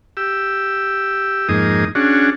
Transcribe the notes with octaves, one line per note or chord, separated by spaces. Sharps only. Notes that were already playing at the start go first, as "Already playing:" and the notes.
G4 E6
F2 G#2 A#3 D#4 G#4 D#6
C#4 D4 F#4 G#4